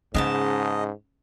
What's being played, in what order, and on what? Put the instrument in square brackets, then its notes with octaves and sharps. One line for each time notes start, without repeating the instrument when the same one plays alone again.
[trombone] G#2 [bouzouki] C#3 B3 A5 [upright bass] C#4 [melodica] D#5